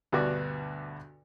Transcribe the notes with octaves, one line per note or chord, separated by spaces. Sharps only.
D2 G2 B2 B3 F#4 D5